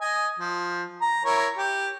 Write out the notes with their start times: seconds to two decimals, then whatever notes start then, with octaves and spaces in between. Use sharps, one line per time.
0.01 D#5 G#5
0.39 F3
1.01 A#5
1.25 E4 A#4 C#5
1.58 G4